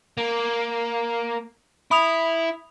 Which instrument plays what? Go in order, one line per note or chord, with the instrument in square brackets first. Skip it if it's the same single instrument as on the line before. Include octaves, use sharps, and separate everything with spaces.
[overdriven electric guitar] A#3
[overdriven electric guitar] E4 [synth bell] B5 D#6 F7